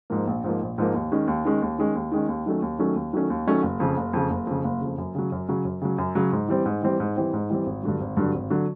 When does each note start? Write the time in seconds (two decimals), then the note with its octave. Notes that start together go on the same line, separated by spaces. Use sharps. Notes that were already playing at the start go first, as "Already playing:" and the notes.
0.10 G#2 F3 A#3
0.27 A#1
0.44 G#2 F3 A#3
0.61 A#1
0.78 G#2 F3 A#3
0.94 D#2
1.12 D#3 G#3 C#4
1.27 D#2
1.45 D#3 G#3 C#4
1.62 D#2
1.78 D#3 G#3 C#4
1.95 D#2
2.11 D#3 G#3 C#4
2.28 D#2
2.46 D#3 F#3 A3 C#4
2.62 D#2
2.79 D#3 F#3 A3 C#4
2.95 D#2
3.13 D#3 F#3 A3 C#4
3.30 D#2
3.47 D#3 F#3 A3 C#4
3.63 F#1
3.80 F2 C#3
3.97 F#1
4.13 F2 C#3
4.30 F#1
4.47 F2 C#3
4.64 F#1
4.81 F2 C#3
4.98 F#2
5.15 C#3 F#3
5.32 F#2
5.48 C#3 F#3
5.65 F#2
5.82 C#3 F#3
5.98 F#2
6.15 C#3 F#3
6.32 G#2
6.48 E3 G3 C4
6.65 G#2
6.82 E3 G3 C4
7.00 G#2
7.16 E3 G3 C4
7.33 G#2
7.50 E3 G3 C4
7.66 G#1
7.83 G2 D3 F#3
8.01 G#1
8.17 G2 D3 F#3
8.34 G#1
8.50 D3 F#3